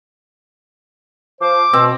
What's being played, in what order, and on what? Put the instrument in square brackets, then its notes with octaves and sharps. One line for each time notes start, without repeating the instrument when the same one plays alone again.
[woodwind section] F3 C5 [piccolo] D6
[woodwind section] B2 [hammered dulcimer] C4